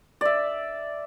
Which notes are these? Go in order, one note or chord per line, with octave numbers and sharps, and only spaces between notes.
D5 E5